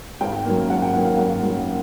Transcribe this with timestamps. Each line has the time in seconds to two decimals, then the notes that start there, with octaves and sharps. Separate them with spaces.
0.21 G#1 G5
0.45 F#2 D#3 F#3 A#3
0.70 G#1 F#5
0.82 G5
0.94 F#2 D#3 F#3 A#3 F#5
1.05 F5
1.18 G#1 F#5
1.42 F#2 D#3 F#3 A#3